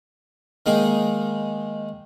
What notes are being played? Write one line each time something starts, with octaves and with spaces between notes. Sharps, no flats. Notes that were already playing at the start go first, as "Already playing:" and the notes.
D#3 G#3 A#3 D#4 G#4